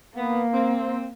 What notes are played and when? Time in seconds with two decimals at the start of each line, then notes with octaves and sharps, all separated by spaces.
0.16 A#3 B3
0.54 C4